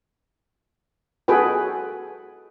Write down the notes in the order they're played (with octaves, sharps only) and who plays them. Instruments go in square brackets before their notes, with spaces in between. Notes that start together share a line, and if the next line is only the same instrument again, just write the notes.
[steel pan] F#4 G#4 A4 B4 G5